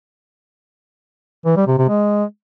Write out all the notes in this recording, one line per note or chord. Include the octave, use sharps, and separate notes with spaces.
E3
G3
C3
C3
G#3